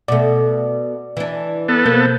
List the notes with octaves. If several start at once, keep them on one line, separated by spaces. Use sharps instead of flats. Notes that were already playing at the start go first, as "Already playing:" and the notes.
B2 A3 D5
E3 D4
B3 A4
B2 F3 A#3 G6